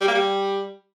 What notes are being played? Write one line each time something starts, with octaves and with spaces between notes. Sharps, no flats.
G3
A#3
G3